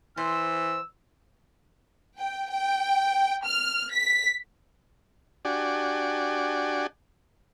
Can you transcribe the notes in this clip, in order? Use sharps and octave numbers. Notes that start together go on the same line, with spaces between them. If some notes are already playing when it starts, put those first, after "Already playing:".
E3 C5 E6
G5
G5
F6
B6
D4 F#4 G4 D5 G#5